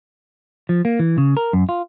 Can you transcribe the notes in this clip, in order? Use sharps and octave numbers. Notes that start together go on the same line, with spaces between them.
F3
A#3
E3
C#3
A#4
F#2
F4